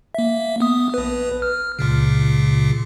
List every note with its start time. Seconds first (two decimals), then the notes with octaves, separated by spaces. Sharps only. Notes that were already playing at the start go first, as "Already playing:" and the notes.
0.14 A#3 E5
0.60 B3 D#6
0.94 A#1 B4
1.42 F6
1.79 C#2 A#2 C#3